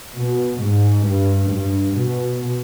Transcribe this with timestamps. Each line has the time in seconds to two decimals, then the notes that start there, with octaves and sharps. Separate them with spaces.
0.16 B2
0.62 G#2
1.06 G2
1.51 G2
1.96 B2